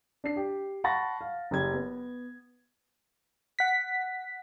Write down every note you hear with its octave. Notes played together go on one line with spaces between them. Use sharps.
D4 C7
G4
F#5 A5 B5 C#6 A6 A#6
F5
F#1 G4 G#6
B3
F#5 B6